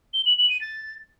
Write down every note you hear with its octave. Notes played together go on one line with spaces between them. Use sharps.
G7
F#7
F#7
D#7
A6